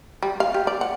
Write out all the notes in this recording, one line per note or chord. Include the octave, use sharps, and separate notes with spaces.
G3
F5
G4
D5
F#5